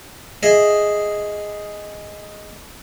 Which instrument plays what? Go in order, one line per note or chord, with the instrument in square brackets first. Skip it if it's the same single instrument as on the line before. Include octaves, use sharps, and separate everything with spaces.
[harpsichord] G#4 D#5 E5